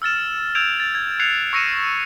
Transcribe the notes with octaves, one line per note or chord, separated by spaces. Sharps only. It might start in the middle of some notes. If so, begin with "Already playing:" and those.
E6 F6 A6 E7
E6 G6 G#6 D7 E7 F7
A6
G#6
F#6 G#6 C7 C#7 F7
C#6 E6 A#6 C#7 D#7 E7